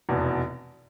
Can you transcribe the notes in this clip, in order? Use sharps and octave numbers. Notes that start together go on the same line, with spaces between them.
F1 E2 B2